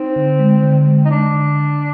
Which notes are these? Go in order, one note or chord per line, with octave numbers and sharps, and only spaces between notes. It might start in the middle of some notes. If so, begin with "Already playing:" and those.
Already playing: C4 D#4
D3
G#3
D3
G#3
D#4
G#3 D4
D3
D3